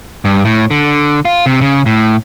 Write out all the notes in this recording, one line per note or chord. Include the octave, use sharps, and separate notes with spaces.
G2
A2
D3
F4
C3
C#3
A2